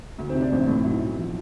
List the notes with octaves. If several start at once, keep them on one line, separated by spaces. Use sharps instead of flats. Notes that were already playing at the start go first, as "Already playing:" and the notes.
D2
C4
C3
D4
A1 C4
A2
B1 E4
B1
F3